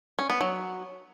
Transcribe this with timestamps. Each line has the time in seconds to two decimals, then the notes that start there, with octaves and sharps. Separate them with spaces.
0.19 C#4
0.30 B3
0.41 F#3